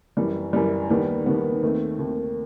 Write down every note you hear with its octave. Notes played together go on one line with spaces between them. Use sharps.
F#2 E3 G3
F#2 E3 G3
D#2 D#3 G3 B3
D#2 D#3 G3 B3
D#2 D#3 A3 C4
D#2 D#3 A3 C4